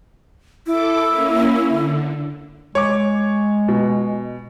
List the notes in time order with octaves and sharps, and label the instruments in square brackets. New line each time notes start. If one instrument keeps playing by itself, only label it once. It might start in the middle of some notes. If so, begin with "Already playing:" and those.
[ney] E4 [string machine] A4 D6
[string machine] A#3 C#4
D3
[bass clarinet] G#3 [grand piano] C#5 D6
[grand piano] B2